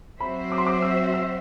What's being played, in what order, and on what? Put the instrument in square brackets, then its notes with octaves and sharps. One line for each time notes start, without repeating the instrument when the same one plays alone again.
[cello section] F#3 C4 F#4 C5 E5 [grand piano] B5
[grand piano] D6
C6
D6
E6
E6